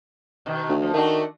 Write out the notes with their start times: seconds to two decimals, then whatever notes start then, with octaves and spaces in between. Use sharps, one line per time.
0.46 B2 D#3
0.69 D2
0.82 F3
0.94 D#3 A3 D4 F#4